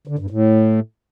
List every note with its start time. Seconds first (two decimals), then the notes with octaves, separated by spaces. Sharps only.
0.07 D3
0.19 G2
0.30 A2